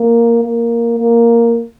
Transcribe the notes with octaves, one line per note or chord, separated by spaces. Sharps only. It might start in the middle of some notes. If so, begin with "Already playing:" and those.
Already playing: A#3
A#3
A#3